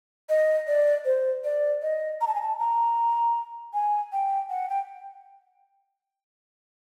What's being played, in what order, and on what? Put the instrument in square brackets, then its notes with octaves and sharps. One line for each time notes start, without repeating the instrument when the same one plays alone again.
[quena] D#5
D5
C5
D5
D#5
A#5
A5
G#5
A5
A#5
G#5
G5
F#5
G5